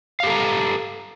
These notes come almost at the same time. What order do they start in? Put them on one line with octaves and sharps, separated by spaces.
F5 G4 A4 A#5